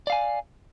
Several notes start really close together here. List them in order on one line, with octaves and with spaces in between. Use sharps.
D5 F5 G#5